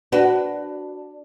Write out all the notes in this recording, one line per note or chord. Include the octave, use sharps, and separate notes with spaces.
D4 F#4 B4